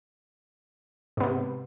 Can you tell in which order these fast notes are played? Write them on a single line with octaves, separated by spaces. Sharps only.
G#2 B3 C3